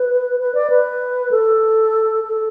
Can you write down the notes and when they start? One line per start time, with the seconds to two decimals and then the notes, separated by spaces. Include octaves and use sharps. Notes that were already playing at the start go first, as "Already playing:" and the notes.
Already playing: B4
0.40 B4
0.55 D5
0.70 B4
1.31 A4
2.24 A4